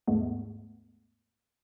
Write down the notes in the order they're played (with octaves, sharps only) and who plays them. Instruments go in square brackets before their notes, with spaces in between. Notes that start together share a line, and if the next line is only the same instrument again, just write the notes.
[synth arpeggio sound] D#2 G#2 G#3 A3 B3